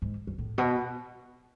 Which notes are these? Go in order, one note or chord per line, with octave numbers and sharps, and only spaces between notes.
G#2
F#2
A2
B2